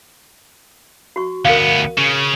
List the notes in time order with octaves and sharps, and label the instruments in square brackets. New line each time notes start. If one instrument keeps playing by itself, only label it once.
[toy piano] F#4 C#6
[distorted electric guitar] D2 B3 [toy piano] A#4 F5
[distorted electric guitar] C#3